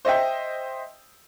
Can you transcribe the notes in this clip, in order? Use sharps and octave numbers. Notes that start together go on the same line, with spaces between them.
C5 D#5 E5 G5